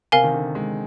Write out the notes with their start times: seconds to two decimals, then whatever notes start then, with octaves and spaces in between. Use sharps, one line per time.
0.12 C3 A#4 F5 G#5
0.23 D#3
0.34 D3
0.55 G#3